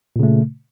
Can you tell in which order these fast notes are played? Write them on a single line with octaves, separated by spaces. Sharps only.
A#2 C#3 A3